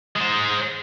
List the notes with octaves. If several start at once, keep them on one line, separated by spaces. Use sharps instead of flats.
G#3 C5